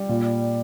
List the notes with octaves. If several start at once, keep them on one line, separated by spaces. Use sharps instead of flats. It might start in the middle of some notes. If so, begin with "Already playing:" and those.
Already playing: G3
A#2